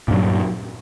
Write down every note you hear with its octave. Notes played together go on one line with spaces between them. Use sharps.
G2 A#2 F#3